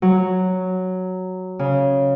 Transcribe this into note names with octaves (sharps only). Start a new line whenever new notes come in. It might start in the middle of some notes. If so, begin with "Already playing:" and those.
F#3
C#3